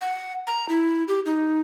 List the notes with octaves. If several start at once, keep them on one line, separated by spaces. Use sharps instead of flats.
F#5
A#5
E4
G4
D#4